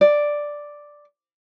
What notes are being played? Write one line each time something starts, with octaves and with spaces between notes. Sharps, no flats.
D5